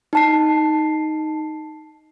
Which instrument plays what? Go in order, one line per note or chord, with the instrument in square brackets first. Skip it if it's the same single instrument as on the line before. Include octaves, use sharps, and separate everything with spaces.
[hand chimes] D#4 A5 C7